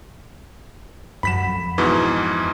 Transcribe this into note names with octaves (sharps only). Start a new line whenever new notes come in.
F#2 F#3 B5 B6 E7
F2
G#2 B2 E3